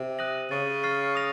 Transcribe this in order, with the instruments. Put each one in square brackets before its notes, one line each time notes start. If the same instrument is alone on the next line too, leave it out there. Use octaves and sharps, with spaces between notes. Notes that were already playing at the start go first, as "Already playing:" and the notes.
Already playing: [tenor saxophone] C3
[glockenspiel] D#6 F#6 A#6 D#7 F#7
[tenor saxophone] C#3 [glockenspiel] C#6 A6 D#7
[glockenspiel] C#6 F6 A6 C7
D#6 A#6 F7